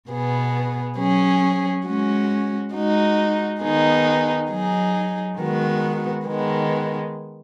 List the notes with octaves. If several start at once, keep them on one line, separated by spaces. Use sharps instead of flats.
B2 B3 G#4
F#3 C#4 G#4
G#3 C#4 F#4
G#3 D#4 F#4
D#3 B3 D#4 G#4
F#3 D#4 G#4
D#3 G#3 B3 F#4
D#3 G#3 B3